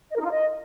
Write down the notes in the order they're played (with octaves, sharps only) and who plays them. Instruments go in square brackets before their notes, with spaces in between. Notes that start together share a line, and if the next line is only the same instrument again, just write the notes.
[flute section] D#5
A#4
D#4
F4
D#5